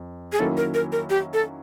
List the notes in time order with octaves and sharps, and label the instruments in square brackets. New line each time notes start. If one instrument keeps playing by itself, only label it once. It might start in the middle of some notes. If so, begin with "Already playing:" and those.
Already playing: [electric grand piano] F2
[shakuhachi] G#4
[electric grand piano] D#3 F#3 A#3 C#4 E4 [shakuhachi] A4
[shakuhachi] A#4
A#4
A#4
G4
A4